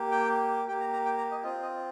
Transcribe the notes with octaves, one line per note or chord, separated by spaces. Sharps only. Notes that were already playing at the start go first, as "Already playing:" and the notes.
Already playing: A#3 G4
G5
A#3 G4 G5
A#5
A#5
G5
A#5
D#5
C4 F4 D#5
D#5